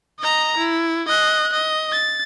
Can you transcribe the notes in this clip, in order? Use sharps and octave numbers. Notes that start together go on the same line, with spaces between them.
D#5 A#5
E4
D#5 F#6
D#5
A6